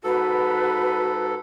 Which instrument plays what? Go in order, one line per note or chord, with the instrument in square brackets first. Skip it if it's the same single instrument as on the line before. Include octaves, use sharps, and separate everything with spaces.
[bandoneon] G#2 A4 [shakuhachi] F#4 [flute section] B4